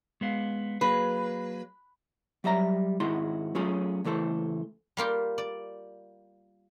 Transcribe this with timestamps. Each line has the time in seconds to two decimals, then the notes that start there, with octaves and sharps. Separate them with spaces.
0.21 G#3 B3 F5
0.81 F#3 A#3 G#4 B4
2.44 F#3 G3 E5 A#5
3.00 G#2 D#3 G#3 E4 F#4 C6
3.55 F#3 A3 C#4 F4 G#4
4.04 C#2 E3 A3 A4 C5
4.97 G3 A#3 F4 G4
5.38 D5